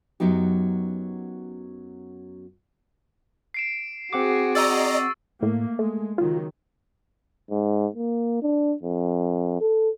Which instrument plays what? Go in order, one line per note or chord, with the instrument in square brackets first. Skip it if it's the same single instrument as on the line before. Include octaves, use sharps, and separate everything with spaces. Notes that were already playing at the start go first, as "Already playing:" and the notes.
[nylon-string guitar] F#2 F#3 B3 D#4 G4
[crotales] C7 D7 E7
[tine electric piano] C4 F#5 D6 [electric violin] F#4 G#4
[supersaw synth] D5 D#5 A#5 [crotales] C#6 E6 A6
[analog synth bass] A2 [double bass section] A3 A#3
[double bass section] G#3 [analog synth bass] A3
[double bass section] C#2 D#3 F#3 [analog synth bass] F4
[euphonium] G#2
A#3
D4
F2
A4